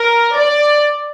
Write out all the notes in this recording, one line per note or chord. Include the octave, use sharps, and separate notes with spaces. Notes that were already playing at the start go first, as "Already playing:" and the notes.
Already playing: A#4
D5